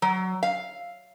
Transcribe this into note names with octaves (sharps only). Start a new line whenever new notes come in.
F#3
F5